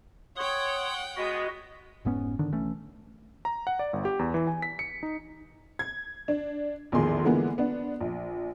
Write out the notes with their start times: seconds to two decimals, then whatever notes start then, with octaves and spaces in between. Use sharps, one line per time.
0.37 C#5 F#5 G5 C6 D#6
1.17 G#3 B3 F#4 D#5
2.05 F1 G#2 B3 C#4
2.39 G#2 D3 D#3 D4
2.52 B1 E3 A3 C#4
3.45 A#5
3.67 F#5
3.79 D5
3.93 G1
4.05 G4
4.19 E2
4.34 E3
4.47 G#5
4.62 B6
4.79 C#7
5.03 D#4
5.79 G#6
6.28 D4
6.92 A#1 E2 A2 D#3 G#4 C6
7.24 D3 E3 G#3 A#3 B3
7.58 B3 D4
8.00 A#1